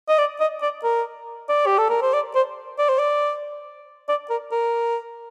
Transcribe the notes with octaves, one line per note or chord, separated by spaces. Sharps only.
D#5
D5
D#5
D5
A#4
D5
G4
A4
A#4
C5
D5
C5
D5
C5
D5
D5
A#4
A#4